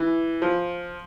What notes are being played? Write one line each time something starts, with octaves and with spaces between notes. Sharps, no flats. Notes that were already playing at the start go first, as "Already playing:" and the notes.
Already playing: E3
F3